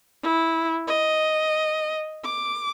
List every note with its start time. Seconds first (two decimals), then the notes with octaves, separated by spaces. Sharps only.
0.23 E4
0.88 D#5
2.25 D6